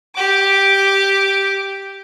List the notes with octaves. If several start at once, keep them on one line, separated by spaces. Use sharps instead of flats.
G4 D6